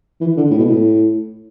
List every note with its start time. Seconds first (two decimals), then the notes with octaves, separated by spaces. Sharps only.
0.21 E3
0.36 D3
0.51 A2
0.58 B2
0.65 A2